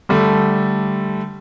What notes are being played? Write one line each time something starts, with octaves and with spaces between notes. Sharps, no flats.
D3 G3 A3